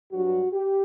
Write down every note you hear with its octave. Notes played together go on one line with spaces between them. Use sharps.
G2 F#3 F#4
G4